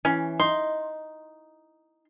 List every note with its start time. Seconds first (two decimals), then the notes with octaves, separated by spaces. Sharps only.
0.05 E3 C#4
0.39 D#4 C6